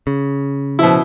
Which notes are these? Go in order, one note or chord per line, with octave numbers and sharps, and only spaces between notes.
C#3
B2 F3 E4